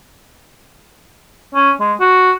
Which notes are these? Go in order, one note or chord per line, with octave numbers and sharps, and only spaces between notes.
C#4
G#3
F#4